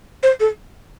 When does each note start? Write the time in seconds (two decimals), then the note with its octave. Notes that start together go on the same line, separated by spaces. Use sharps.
0.23 C5
0.40 A4